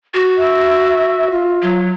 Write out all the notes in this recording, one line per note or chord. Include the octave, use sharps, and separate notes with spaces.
F#4
E5
F4
F#3